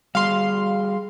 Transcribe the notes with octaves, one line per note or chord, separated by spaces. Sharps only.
G3 F#4 G#4 F5 C6